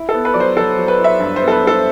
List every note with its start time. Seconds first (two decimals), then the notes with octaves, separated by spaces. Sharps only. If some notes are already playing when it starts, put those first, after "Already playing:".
Already playing: E4
0.09 A4
0.14 B3
0.25 B4
0.34 F#3 D5
0.40 C5
0.56 F#3 A4
0.78 F#3
0.88 B4
1.00 E4 E5
1.20 G2
1.36 C5
1.42 B3
1.48 A4
1.52 B4
1.62 G2 A4